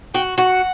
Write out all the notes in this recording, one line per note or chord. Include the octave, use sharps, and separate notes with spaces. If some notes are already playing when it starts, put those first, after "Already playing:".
F#4 G5
F#4 F#5